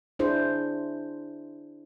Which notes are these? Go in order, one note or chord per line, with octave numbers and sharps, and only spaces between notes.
D4 E4 G#4 C5